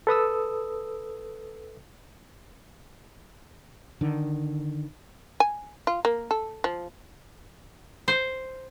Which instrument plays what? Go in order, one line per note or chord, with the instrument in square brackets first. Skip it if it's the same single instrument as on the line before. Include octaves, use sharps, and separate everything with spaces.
[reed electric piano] A4 B4 D#6 E6
[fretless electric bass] D3 D#3
[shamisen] G#5
F4
A#3
A4
F3
[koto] C5